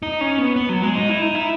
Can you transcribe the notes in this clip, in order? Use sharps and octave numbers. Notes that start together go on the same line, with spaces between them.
D#4
C#4
B3
B3
F#3
G#3
D#4
E4
D#4
E4